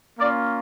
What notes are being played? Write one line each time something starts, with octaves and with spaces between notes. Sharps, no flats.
A#3 C#4 F4 D5